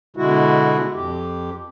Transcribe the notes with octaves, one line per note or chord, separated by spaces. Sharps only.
B2 D3 G#3 E4 F#4
F2 G4